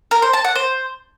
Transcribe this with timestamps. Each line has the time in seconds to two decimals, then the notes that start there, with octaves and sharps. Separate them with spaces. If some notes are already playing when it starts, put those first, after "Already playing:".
0.11 A#4
0.22 C5
0.33 A5
0.44 F#5
0.56 C5